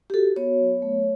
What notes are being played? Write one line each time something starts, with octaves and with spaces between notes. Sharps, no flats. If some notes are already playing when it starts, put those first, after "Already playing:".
G4
F#4 A4
B3 C#5
F#3
A3